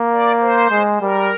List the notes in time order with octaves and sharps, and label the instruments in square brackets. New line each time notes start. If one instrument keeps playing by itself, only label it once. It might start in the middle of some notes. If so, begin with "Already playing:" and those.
Already playing: [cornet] A#3
[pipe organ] D5
C5
[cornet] G#3
[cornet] G3 [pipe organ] A#4